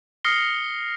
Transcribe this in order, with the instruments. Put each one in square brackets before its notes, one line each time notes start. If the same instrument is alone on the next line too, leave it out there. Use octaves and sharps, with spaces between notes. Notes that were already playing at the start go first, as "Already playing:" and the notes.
[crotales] D#6 F6 A#6 C7 C#7 G7